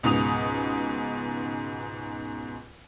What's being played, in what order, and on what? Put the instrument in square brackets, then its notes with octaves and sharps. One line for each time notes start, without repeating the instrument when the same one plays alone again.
[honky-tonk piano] C#2 G#2 B2 D#6 F7